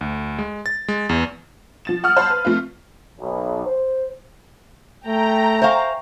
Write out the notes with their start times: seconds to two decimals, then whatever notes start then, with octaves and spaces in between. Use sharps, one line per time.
0.01 D2
0.39 G#3
0.66 A6
0.88 G#3
1.09 E2
1.85 F3 A6 E7
2.04 F#5 D#6 F6
2.17 C5 F5 A5 B5
2.30 B4
2.45 F3 A3 C4 F4
3.20 B1
3.66 C5
5.06 A3 G5 A#5
5.62 C5 E5 F5 G#5 C#6